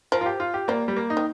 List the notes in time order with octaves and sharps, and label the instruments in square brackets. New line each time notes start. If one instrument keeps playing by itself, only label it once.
[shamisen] F3 [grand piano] A#4
[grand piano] F4
G4
F4
G4
[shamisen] G3 [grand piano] A#3
[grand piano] G3
A#3
D#4
[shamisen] D#3